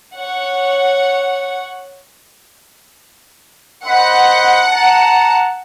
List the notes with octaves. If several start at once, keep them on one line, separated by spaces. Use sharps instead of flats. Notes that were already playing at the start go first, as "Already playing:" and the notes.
C#5 F#5
C5 D#5 F#5 B5
A5 A#5